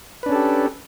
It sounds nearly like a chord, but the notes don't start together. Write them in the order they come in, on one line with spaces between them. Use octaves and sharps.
B4 D4 C#4 A4 G4